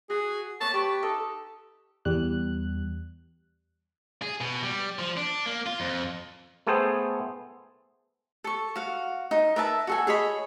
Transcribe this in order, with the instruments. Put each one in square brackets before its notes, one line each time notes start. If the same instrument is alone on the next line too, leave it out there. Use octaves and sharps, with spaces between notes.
[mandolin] F#4 [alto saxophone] G#4
[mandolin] A#3 B4 C#5 [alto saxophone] A5
[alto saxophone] G4 [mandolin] B4 C#6
[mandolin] D#4 A4
[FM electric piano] E2 G3 F#6
[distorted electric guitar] G#4
B2
G3
F3
D4
A#3
F4
F2
[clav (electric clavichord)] A3 B3 G#4 A4 C5 G5
[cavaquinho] A4 C#6
F#4 F5
D#4
A#4 B4 E5 A5
F#4 A4 G#5
G#4 C#5 D#5 B5